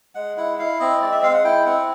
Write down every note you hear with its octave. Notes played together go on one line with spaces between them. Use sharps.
G#3 F#5
E4 F#5
E4 F5
C4 D#5
G#3 D5
E5
G#3 F5
F#5
E4 G5
C4 F#5